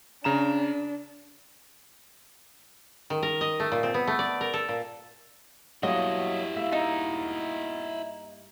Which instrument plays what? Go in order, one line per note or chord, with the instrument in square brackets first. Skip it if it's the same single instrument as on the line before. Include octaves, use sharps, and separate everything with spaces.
[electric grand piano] C#3 A#5 E7 [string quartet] D4
[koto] D#3
A#4
D#5
A3
A#2
C4
B3
A3
D5
A#4
A4
A#2
[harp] G2 [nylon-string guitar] F#3 A#3 [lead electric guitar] E4 F#4 [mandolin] D#5
[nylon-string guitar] A#3 [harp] E5
[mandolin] D#4